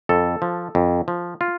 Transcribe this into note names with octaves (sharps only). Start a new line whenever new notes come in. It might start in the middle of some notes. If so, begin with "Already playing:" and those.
F2 A4
F3
F2
F3
F4